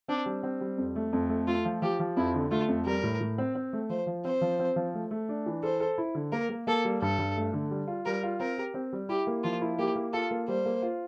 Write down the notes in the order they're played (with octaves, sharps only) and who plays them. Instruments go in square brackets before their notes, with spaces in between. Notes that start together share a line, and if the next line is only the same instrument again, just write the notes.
[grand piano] C4 [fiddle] D4
[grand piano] G3
C4
G3
F2
A3
F2
A3
[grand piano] A3 [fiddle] F4
[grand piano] F3
[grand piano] F3 [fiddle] G4
[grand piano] F3
[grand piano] F2 [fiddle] E4
[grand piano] D3
[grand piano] A3 [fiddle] F4
[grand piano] F2
[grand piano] G3 [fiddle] A#4
[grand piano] A2
A2
C4
C4
A3
[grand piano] F3 [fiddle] C5
[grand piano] F3
[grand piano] C4 [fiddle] C5
[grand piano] F3
C4
F3
A3
A3
D4
E3
[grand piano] A4 [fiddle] C5
[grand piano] A4
E4
D3
[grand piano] A#3 [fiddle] A#4
[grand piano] A#3
[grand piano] A#3 [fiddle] A4
[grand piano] G3
[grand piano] G2 [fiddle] A4
[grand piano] G2
A3
D3
G3
F4
[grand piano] G3 [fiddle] A#4
[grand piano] F4
[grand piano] C4 [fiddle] A#4
[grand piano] G4
C4
G3
[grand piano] E4 [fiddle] G4
[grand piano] A#3
[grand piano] F3 [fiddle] F4
[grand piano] E4
[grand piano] A#3 [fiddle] G4
[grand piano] A#3
[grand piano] F4 [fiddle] A4
[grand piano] A#3
[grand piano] G3 [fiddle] C5
[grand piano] A#3
F4